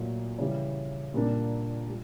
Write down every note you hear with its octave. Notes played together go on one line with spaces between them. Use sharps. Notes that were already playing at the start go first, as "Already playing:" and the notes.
Already playing: A#2 F#3 A3
C#3 E3 G3
A#2 G3 A#3 D4
G3